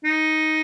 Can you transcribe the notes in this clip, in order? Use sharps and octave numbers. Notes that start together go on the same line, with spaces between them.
D#4